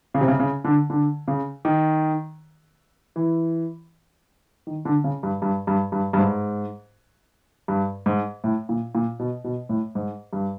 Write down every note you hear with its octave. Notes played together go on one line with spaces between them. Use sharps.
C#3
C3
C#3
C#3
D3
D3
C#3
D#3
E3
D#3
D3
C#3
G2
G2
G2
G2
G2
G#2
G2
G#2
A2
A#2
A#2
B2
B2
A2
G#2
G2